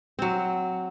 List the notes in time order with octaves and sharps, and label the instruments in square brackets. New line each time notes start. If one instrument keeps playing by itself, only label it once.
[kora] F#3 C4